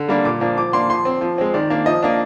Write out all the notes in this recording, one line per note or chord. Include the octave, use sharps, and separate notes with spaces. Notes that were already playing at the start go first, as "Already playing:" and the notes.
Already playing: D3
G3 A#3 D4
A#2 D6
F3 A#3 D4
F3 D6
A#3 D4 C6
F3 C6
C4
F3
G#3 C4
D#3 D5
A#3 D4
F3 D#5
A#3 D4